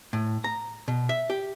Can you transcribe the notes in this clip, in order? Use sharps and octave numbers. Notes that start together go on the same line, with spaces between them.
A2
A#5
B2
E5
G4